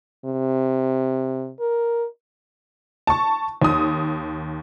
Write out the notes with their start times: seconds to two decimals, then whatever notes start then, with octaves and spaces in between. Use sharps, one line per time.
0.25 C3
1.60 A#4
3.07 A5 C#6
3.62 D#2 D#6